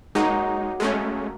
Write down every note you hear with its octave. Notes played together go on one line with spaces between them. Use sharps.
F#3 G#3 A#3 D#4
G#3 A3 C#4